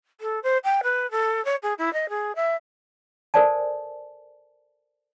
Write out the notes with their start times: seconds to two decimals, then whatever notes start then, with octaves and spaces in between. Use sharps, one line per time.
0.21 A4
0.43 C5
0.64 G5
0.83 B4
1.11 A4
1.45 C#5
1.63 G#4
1.78 E4
1.93 D#5
2.09 G#4
2.36 E5
3.34 A4 A#4 C5 D5 G#5 A5